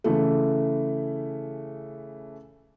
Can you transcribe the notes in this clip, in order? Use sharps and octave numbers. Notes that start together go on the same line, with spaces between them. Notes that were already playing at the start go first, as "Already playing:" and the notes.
C#3 E3 A3